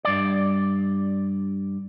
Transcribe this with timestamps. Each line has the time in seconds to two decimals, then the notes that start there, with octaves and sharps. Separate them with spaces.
0.05 G2 D5